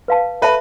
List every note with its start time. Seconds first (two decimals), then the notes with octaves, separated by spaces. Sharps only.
0.08 B4 F5 A5
0.42 A4 B4 E5 A5